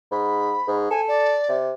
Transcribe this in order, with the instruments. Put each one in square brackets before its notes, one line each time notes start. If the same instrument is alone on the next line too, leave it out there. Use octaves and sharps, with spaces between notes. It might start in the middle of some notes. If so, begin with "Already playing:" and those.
[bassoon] G#2 [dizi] B5
[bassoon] G#2
[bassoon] A4 [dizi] G#5
[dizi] D5
[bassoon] C3